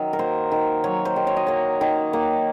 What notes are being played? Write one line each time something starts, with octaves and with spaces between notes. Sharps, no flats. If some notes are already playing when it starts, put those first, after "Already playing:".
Already playing: D#3 F#3
A#4
A#3 C5
D#3
F#3 C#5
C5
D#3
C#5
D#5
A#3 C#5
D#3
A#3